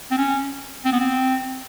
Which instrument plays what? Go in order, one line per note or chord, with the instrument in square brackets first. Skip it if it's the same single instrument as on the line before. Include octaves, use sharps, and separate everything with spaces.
[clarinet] C4
C#4
C4
B3
C4